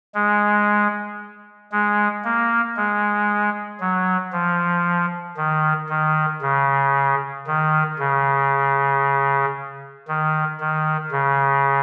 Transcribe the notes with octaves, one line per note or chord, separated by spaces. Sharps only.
G#3
G#3
A#3
G#3
F#3
F3
D#3
D#3
C#3
D#3
C#3
D#3
D#3
C#3